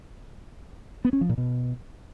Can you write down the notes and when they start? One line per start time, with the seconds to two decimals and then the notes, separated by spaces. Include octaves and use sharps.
1.05 B3
1.13 C#4
1.21 F3
1.29 A#2
1.38 B2